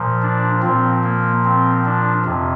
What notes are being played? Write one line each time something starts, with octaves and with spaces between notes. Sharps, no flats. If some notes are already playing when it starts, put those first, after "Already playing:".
Already playing: A#2 F3
D4
A#2 F3 C4
A#3
C4
D4
F2 C3